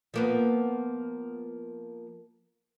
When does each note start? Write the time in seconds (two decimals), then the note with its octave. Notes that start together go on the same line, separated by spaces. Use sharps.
0.14 F3 A#3 B3